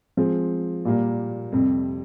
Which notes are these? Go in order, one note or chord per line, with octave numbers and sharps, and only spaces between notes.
F3 G#3 C4
A#2 G3 A#3
F2 C3 G3